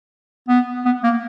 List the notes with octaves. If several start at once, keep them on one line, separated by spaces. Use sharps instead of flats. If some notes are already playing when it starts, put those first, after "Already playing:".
B3
B3
A#3